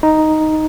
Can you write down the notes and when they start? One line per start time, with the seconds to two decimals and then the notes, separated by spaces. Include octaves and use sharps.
0.03 D#4